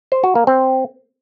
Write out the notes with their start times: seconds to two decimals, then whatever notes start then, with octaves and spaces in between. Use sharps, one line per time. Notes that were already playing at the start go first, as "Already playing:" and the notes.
0.12 C5
0.24 F#4
0.35 A#3
0.47 C4